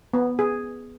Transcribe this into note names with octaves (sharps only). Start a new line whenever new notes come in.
B3
G#4